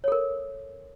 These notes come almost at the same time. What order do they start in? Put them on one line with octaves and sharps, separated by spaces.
C#5 A4 A#4